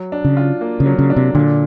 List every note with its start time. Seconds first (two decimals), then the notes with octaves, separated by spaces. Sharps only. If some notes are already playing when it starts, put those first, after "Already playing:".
Already playing: F#3
0.12 D4
0.25 C#3
0.37 F4
0.61 A#3
0.80 C#3
0.86 F#3
0.99 C#3
1.10 D4
1.16 C3
1.35 A#2 D3